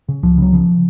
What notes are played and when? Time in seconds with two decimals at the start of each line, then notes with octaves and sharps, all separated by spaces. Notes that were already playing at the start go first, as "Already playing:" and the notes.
0.09 C#3
0.23 C#2 F3
0.38 C#3 F#3
0.53 C#3 F3